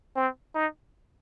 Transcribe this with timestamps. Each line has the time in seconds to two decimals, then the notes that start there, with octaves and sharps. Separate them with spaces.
0.16 C4
0.54 D#4